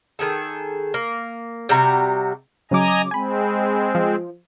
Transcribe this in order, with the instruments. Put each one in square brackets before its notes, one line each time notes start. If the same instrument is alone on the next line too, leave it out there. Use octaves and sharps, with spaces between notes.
[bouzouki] D#3 G#4 A4
A#3
C3 G3 F#4 A#5
[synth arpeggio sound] C#3 F#3 D6 [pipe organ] D#5 G#5 A#5
[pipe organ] G#3 C4 [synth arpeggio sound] G#5 B5
[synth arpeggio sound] F3